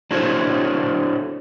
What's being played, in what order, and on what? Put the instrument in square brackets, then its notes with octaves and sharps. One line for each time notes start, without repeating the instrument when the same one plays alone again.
[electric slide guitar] D4 E4 F#4 A4 C5 C#5